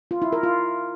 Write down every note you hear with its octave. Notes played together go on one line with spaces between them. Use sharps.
F4
E4
A#4
F4